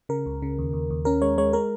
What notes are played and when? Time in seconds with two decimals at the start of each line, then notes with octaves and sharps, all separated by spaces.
0.09 C#3 A#4
0.26 C#2
0.42 C#3
0.58 D#2
0.73 D#2
0.90 D#2
1.05 C#4 A#4
1.22 G#3 C#5
1.38 G#3 C#5
1.53 G#3 A#4